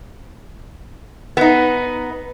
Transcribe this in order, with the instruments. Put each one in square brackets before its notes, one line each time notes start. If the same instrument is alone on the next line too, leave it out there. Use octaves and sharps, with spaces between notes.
[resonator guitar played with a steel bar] B3 D#4